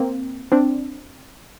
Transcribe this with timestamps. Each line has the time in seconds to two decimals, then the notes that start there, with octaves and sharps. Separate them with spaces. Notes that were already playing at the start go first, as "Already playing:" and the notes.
Already playing: A#3 C4
0.52 C4 D4